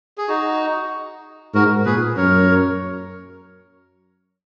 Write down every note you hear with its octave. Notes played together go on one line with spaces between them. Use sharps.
G#4
D#4 F#4
G#2 F#4 A#4
A#2 G#4 B4
F#2 A#4 C#5